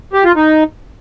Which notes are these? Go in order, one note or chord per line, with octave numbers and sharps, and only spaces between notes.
G4
F4
D#4